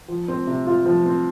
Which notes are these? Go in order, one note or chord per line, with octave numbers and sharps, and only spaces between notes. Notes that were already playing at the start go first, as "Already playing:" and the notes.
F3
C4
C3
F4
F3
C4